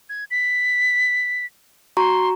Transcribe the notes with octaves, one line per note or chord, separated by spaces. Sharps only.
G#6
B6
F#4 A#5 C6 C#6